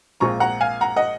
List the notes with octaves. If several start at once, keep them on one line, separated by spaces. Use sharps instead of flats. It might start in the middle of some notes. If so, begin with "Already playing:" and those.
A#1 A#2 G#3 C4 F4 A#5 C#6
F#5 A#5
F5 G#5
F#5 A#5
D#5 F#5